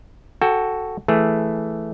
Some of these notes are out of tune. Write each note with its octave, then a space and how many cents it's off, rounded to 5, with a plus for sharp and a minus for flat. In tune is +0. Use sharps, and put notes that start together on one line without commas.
F#4 +5 A4 +0 G5 +25
E3 +0 A3 +0 G#4 +0